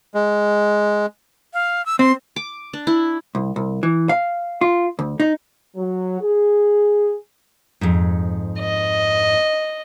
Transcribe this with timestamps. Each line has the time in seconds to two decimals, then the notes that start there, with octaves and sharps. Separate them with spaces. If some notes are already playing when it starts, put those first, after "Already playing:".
0.15 G#3
1.53 F5
1.86 E6
1.99 C4 C6
2.36 D6
2.73 D4
2.87 E4
3.35 C2
3.56 C2
3.83 E3
4.09 F5
4.61 F4
4.99 D2
5.20 D#4
5.76 F#3
6.20 G#4
7.81 F2 G#2
8.60 D#5